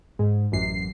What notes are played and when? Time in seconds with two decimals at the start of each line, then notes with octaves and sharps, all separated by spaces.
0.19 G#2
0.52 A1 F#2 C7